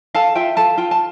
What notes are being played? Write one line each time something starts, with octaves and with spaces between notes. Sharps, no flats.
A4 F5 A5
F4 E5 G5
A4 F5 A5
F4 G5
A5